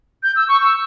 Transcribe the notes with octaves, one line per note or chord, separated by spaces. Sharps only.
G6
E6
C#6
E6